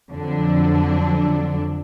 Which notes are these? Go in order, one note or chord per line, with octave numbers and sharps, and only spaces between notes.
F2 D3 F#3 D4